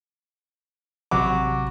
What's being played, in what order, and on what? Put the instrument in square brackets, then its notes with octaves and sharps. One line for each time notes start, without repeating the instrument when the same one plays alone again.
[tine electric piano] A1 C3 B5 [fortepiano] F#3 D6